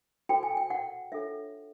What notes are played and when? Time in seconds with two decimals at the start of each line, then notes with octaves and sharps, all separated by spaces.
0.29 F#4 A4 C5 G5
0.43 G#5
0.57 G5
0.70 F#5
1.12 D4 F4 A4 C#5 E5